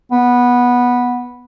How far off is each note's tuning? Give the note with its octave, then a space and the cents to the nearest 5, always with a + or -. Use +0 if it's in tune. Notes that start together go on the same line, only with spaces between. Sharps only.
B3 -10